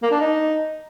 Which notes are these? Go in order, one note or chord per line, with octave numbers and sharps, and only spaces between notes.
A#3
D4
D#4